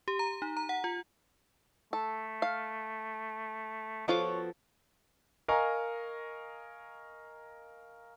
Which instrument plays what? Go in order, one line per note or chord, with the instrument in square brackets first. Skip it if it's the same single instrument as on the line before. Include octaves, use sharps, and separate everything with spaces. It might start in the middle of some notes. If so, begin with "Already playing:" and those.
[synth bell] G4
A#5
D#4
A#5
F#5
F4
[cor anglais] A3 [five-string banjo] A4
[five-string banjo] F5
[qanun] F3 A4 D6 [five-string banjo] B3 F4 F#4 [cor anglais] C#5
[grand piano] A#4 D#5 F5 G#5 A#5 C#6